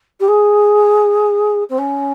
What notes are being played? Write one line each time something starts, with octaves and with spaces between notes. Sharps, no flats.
G4
G#4
C4
C#4